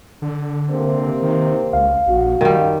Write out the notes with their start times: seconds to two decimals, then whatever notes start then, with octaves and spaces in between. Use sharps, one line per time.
0.22 D3
0.70 C3 A#3 C4
1.22 D#3
1.73 C#2 F5
2.07 A#1 F#4
2.41 F#2 D#3 G3